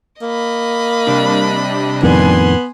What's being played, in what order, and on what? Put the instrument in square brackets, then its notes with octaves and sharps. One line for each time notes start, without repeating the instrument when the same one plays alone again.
[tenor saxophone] A#3 [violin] D#5 B5
[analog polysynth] C3 G3 D4
[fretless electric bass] F2 A2 D#3 [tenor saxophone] B3 [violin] G#5 C6